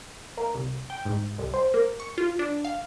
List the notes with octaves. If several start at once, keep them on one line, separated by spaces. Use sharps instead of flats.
A#3
C2
G5
G#2
C2
C5
A#3
C#6
F4
D4
F5